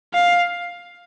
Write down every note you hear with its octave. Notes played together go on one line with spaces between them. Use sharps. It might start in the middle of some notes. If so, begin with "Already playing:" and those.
F5